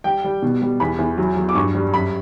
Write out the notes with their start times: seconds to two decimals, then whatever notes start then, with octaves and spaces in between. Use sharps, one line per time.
0.04 G3 G5
0.24 G3
0.42 B2
0.62 G3
0.80 E2 B5
0.99 E2
1.18 F#3
1.37 F#3
1.49 D6
1.55 G2 C#6
1.75 G3
1.93 F#2 B5